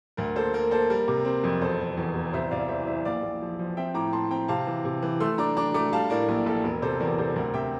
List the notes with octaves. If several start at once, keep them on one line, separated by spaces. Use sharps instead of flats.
D2 A#4
A#3 A4 C5
A#3 A#4
A#3 A4 C5
G3 A#4
C3
C4
F2
E1 A4 C5
E1
E2
E1
C2 C5 E5
C2 D5 F5
E3 C5 E5
E3 C5 E5
A#1 D5 F5
A#1
F3
F3
C4 E5 G5
A2 A#5 D6
A2 A5 C6
C4 G5 A#5
C3 F5 A5
E3
C3
E3
A3 C6 E6
D4 A#5 D6
D4 A#5 D6
A3 A#5 D6
G3 F5 A5
A2 A#4 D5
A#1 A#4
A#1 A4
E1 A#4
C3 A4 C5
E2 A#4 D5
C3 A4 C5
D2 A#4
C3 E5 G5